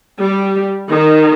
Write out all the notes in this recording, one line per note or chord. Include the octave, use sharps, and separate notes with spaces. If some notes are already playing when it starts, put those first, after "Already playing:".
G3
D#3